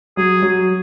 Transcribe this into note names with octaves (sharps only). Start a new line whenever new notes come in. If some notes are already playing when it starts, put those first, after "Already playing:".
F#3 G#4
F#3